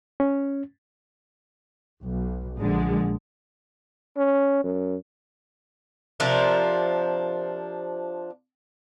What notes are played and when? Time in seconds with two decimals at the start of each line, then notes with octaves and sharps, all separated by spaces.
0.20 C#4
2.03 B1
2.58 A#1 D3 G#3
4.17 C#4
4.64 F#2
6.20 C3 F3 D4 A#4